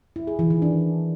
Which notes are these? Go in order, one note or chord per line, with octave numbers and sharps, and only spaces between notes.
E4
G#4
E3
D#3
D4